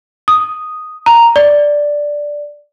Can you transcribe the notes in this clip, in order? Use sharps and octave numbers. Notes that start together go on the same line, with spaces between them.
D#6
A#5
D5